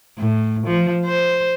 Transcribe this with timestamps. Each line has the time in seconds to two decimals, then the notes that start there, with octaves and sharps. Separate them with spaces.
0.18 A2
0.67 F3
1.05 C5